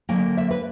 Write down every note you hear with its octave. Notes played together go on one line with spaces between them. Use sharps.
D3 F#3 A#3 G#5
E5
B4